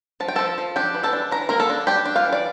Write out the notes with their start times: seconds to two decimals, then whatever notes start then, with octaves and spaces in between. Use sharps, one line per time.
0.20 F3 A5
0.28 G5
0.36 F3 A4 A5
0.58 F3
0.76 D4 G4 G5
0.95 E3
1.03 A4 A5
1.13 D4
1.32 E3 A#5
1.49 A#3 A#4 A#5
1.60 A4 A5
1.69 D4
1.87 D4 G4 G5
2.05 D4
2.16 F4 F5
2.25 E3
2.32 D5